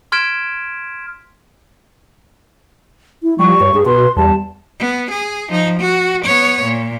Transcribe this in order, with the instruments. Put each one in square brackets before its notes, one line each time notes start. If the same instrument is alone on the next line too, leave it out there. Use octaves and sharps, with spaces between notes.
[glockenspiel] C6 F6 G#6 B6 D7 E7
[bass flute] E4
[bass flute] F3 [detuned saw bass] G3 [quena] C#6
[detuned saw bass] G2 [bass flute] C#5
[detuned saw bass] G2 [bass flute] G#4
[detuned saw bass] B2 [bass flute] B4 [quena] C6
[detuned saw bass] E2 [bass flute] G3 [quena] A5
[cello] B3
G#4
F3 D#4
F#4
B3 C#5
A#2